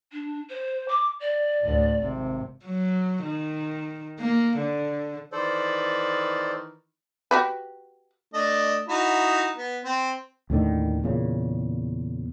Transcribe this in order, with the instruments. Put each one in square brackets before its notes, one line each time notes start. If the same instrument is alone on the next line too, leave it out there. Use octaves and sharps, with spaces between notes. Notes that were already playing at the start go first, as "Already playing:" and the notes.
[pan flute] D4
C5
D6
D5
[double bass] D2 A2
G#1 C3
[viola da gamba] F#3
D#3
A#3
D3
[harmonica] D#3 E3 B4 [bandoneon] A4 C5 D5
[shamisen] F#4 G4 B4
[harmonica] A3 D4 D#5
D#4 E4 F#4
B3
C4
[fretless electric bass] D#2 A2 D3 D#3
E2 A#2 C#3